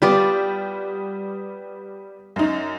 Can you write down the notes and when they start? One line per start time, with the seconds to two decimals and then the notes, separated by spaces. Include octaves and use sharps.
0.02 G3 B3 F4 G4 D5
2.36 F#2 D#4